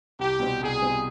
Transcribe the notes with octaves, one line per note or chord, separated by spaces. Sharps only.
C2 G4
B2 G3 C4
C2 G#4
B2 G3 C4